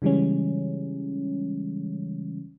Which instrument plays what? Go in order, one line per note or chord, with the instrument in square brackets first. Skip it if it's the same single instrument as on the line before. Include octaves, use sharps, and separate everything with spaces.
[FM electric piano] C#3 E3 G3 G#3 C#4